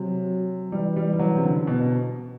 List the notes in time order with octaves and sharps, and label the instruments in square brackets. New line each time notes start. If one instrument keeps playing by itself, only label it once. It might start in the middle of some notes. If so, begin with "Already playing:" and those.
Already playing: [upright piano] C3 [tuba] F#3
[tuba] E3 [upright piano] G3
[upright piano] G3
G3
F#3
C3
D3
B2
B2